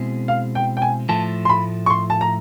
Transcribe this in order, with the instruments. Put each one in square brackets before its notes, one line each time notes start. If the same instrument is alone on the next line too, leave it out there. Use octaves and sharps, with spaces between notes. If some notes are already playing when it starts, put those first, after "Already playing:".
Already playing: [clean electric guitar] B2 G#3 C4 E4 G#4
[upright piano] F5
G5
G5
G#5
[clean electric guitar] A2 F3 A3 [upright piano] A5
[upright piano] C6
B5
C#6
C6
A5
A#5